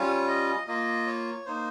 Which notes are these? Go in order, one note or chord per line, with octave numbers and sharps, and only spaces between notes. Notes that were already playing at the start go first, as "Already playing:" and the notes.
Already playing: G3 C#4 F4 C#5
D#5
A#3 F4 D#5
C#5
A#3 D#4 C5